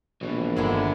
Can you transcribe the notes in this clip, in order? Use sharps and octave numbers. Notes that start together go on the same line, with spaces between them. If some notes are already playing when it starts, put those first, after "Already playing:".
A#1 B2 E3
G1 D3 D#3 G#3 B3 E4